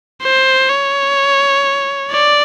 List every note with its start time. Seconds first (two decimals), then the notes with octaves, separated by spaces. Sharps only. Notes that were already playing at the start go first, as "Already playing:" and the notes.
0.23 C5
0.70 C#5
2.11 D5